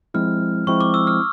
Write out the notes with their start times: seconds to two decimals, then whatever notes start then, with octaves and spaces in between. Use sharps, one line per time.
0.14 F3 G#3 C4 E4 F6
0.67 F3 G#3 C4 E4 C#6
0.80 D6
0.94 E6
1.07 F6